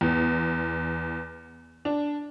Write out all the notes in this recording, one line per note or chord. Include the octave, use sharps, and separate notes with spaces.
E2
D4